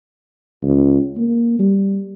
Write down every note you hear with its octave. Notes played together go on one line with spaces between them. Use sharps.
C#2
A#3
G3